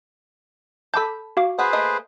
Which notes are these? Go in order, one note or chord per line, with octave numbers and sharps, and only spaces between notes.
A4 A5 B5 D6 G6
F#4 F5 D6
B3 G#4 B4 C5 F#5
A3 A#3 D#5